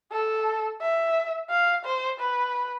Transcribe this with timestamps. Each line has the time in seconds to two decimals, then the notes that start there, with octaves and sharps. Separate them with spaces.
0.12 A4
0.81 E5
1.50 F5
1.85 C5
2.20 B4